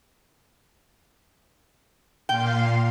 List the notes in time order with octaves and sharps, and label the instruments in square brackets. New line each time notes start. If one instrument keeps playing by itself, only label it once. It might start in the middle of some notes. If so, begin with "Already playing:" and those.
[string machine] A#2 F5 C6 [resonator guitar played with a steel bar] G5